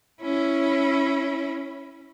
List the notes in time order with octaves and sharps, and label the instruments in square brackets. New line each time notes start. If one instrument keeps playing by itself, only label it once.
[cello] C#4 E4